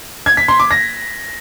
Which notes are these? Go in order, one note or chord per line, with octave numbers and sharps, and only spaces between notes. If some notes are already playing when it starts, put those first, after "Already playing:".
G#6
B6
C6
D6
A#6